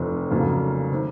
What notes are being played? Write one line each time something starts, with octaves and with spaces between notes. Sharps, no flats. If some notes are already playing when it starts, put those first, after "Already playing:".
Already playing: F1 F2 C3 F3
F1 F2 C#3 F#3 A#3
C3 D#3